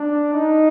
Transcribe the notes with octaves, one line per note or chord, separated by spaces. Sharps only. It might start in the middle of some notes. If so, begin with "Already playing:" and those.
Already playing: D4
D#4